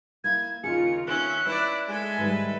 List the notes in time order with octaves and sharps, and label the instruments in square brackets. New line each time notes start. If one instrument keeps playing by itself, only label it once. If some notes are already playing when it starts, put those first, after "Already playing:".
[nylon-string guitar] A#3 E4 [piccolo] G#6
[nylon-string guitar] D#2 C#3 G#4 [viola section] F4 A#4 [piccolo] C#7
[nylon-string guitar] D#3 [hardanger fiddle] C#4 [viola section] E5 [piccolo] F#6
[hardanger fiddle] E4 D5 [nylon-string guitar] B4 C#5
[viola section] G#3 [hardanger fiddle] A4 E5 [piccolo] G#5
[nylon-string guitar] G#2 D#3 G3 [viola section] B4